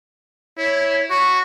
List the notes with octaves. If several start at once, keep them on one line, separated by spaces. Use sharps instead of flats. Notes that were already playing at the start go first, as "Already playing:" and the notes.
E4 C#5
F#4 C#6